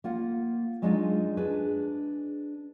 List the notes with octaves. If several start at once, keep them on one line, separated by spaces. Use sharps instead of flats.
A#3 F4 F#5
F#3 G#3 C4 D4 D#4 F4
D4 G#4 B4